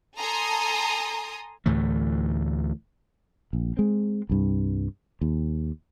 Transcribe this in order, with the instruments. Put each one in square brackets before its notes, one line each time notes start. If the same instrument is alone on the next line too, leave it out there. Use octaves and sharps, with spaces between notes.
[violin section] A4 G#5 A#5 C6 D#6
[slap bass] D2 A2 E3 A3
[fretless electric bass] A#1
G#3 C4
C2 G2
D#2